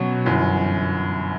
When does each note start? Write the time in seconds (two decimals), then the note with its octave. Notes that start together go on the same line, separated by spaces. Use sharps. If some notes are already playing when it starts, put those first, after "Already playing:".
Already playing: B2 F#3 C#4 F#4
0.24 G1 F#2 E3